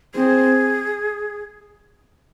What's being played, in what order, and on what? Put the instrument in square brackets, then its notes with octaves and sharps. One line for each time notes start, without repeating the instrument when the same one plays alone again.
[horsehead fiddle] C4 [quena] G#4